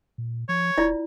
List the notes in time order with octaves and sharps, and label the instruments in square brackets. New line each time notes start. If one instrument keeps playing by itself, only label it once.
[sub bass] A#2
[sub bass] F3 [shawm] C#5
[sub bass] D#1 [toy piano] E4 F4 D5